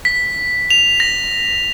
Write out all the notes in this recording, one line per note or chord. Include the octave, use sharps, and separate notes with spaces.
B6
F7
A#6